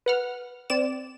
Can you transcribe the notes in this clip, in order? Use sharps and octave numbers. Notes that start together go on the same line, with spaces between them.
B4 F#5 F6
C4 D5 E7